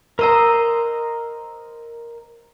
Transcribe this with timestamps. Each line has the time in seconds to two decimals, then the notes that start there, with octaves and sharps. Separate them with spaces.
0.19 A#4 C5 D#5 A#5 E6